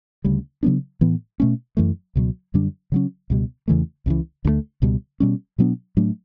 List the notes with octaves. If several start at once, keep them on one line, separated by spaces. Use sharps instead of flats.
D2 C#3 G3
C#3 F#3 B3 D4
A2 E3 B3
B2 A3 C#4
F#2 E3 A3
C#2 B2 F#3
F#2 D3 G3 D4
C#3 F#3 C#4
C#2 B2 G3
E2 C#3 E3 A3
C#2 C#3 E3
D2 D3 F#3 A3
C#2 B2 G3
B2 G3 C#4
B2 F#3 B3 D4
A2 F#3 A3 D4